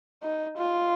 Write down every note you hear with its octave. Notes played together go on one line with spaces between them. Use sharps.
D#4
F4